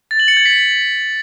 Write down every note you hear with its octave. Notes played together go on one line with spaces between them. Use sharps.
A6
F#7
C#7
G#6
B6